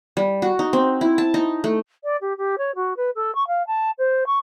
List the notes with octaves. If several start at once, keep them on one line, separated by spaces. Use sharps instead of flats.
G3
F#4
D#4
C4
E4
A5
D#4
A3
D5
G4
G4
C#5
F#4
B4
A4
C#6
F5
A5
C5
C#6